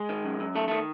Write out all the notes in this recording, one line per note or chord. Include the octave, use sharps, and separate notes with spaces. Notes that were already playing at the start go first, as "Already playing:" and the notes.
Already playing: G#3
D#3
F#2
F#2
D#3 A3
D#3 A3